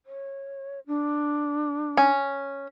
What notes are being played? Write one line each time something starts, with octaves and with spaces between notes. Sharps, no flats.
C#5
D4
C#4